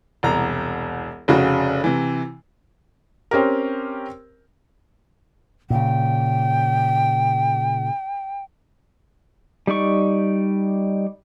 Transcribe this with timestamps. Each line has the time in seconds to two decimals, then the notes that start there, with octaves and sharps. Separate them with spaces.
0.23 E1 C2 A#5
1.28 F1 C#3 F#4
1.84 C3 E3
3.31 C4 C#4 G4 A#4
5.70 A#2 C#3 G5
9.67 G3 D#4 D5 C#6